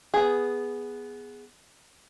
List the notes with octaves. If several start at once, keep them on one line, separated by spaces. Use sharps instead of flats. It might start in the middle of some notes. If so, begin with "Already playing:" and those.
B3 G#4